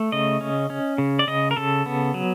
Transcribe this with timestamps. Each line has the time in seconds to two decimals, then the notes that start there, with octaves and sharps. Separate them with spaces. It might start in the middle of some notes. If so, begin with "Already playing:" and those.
Already playing: A3
0.12 C#3 D#5
0.41 C#4
0.70 C#4
0.98 C#3
1.19 D5
1.27 C#3 D#5
1.51 A#4
1.56 C#3 A4
1.86 B3
2.14 F#3